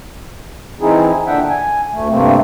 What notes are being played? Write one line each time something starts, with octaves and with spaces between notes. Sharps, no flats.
E3 C4 D#4 E4 G#4
A#2 D3 D4 E5 F#5 G5
G#5
D2 A3
G2 C3 A3 A#3 C4